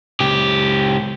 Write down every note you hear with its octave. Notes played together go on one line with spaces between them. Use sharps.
C#2 G4